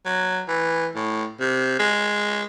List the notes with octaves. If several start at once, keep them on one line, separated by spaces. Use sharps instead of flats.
F#3
E3
A2
C3
G#3